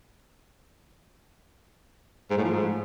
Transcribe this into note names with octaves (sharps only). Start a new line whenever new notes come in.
G#2
A2
F3
G#2